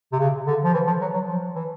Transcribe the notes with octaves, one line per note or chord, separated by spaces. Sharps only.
C3
C#3
D3
F3
E3
F3
F#3
F#3
F3
E3